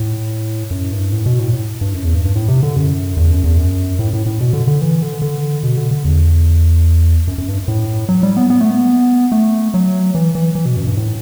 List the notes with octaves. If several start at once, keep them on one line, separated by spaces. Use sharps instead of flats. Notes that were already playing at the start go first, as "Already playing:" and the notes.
Already playing: A2
F#2
G2
A2
B2
A2
A2
G2
F#2
E2
G2
G2
A2
C3
D3
F#2
E2
F#2
E2
F#2
A2
A2
A2
B2
D3
D3
E3
D3
D3
B2
D3
D3
E2
F#2
F#2
G2
A2
F#3
G3
B3
B3
A3
B3
A3
F#3
E3
E3
E3
B2
F#2
G2
A2